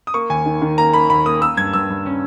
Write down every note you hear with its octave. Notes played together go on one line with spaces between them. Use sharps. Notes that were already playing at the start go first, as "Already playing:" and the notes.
D#6
A#3 C#6
D#2 G#5
D#3
D#3
A#3 A#5
A#3 B5
D#2 B5
A#3 D#6
A#3 E6
G2 G#6
G2 E6
G2
C#4